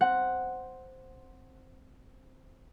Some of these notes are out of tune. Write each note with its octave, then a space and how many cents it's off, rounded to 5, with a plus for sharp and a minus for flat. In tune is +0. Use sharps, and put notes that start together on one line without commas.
C4 +0 F#5 +0